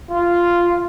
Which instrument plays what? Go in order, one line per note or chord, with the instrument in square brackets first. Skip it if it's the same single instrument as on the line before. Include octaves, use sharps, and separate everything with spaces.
[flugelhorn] F4